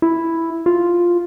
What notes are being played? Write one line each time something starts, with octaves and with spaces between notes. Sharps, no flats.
E4
F4